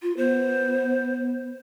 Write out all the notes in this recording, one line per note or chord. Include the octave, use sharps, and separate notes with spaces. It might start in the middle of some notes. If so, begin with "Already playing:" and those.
F4
B3 C5